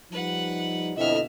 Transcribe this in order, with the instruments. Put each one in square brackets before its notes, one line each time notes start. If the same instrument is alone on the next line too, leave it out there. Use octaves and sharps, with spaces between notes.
[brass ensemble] F3 G3 D#4 [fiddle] B4 F#5
[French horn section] F2 E4 D#5 [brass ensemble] B2 D3 [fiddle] E5 F6